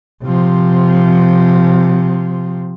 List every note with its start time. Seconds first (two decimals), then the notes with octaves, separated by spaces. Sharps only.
0.23 C3 F3